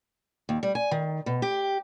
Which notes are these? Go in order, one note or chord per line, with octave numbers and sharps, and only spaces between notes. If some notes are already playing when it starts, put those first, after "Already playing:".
D#2
G3
G#5
D#3
B2
G4